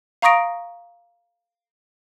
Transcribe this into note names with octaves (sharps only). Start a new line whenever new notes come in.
F5 A#5 C#6 D#6 A#6 D7